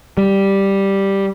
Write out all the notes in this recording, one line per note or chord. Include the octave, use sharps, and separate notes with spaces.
G3